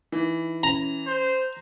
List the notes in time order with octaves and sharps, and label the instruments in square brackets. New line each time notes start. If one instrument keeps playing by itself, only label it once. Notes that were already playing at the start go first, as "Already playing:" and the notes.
[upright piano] E3 [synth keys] D#4
[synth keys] C#4 [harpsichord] A#5
[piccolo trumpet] C5